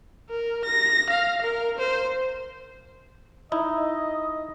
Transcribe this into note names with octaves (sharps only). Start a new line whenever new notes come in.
A#4
A#6
F5
A#4
C5
D#4 E4 D#5